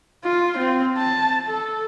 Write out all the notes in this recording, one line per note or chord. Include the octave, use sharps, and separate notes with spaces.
F4
C4
A5
A4